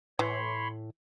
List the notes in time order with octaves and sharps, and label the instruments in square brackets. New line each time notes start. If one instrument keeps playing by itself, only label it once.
[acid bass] A2 [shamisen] E3 [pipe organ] C#5 B5 C6